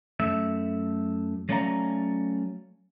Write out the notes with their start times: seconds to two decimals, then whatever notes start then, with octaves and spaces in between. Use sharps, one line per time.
0.20 F#2 A3 E5
1.49 F#3 A3 C#4 D5 F5 A#5